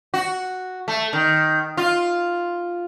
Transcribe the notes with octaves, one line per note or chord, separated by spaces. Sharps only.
F#4
A3
D#3
F4